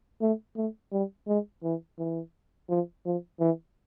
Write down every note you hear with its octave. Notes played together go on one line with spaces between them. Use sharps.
A3
A3
G3
G#3
E3
E3
F3
F3
E3